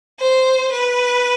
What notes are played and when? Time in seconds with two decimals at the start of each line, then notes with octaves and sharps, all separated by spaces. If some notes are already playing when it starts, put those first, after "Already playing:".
0.20 C5
0.72 B4